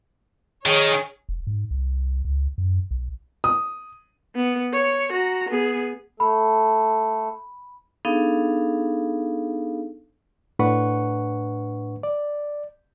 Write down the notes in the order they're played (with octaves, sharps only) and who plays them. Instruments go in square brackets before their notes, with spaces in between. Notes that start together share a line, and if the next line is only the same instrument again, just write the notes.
[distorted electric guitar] D#3 [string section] G#4 C#5
[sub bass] F1
G#2
C2
C#2
F#2
B1
[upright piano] D#6
[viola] B3
C#5
F#4 A#5
B3 G#4
[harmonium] A3 A4 [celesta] B5
[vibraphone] B3 D4 D#4 G#4 A4 F5
[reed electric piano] A2 D4 B4 F#5 C#6
D5